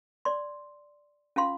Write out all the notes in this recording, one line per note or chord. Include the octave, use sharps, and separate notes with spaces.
D5 C6
C#4 F4 F5 C6